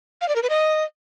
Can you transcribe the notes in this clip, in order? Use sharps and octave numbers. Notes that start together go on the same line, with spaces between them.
F5
D5
A#4
B4
D#5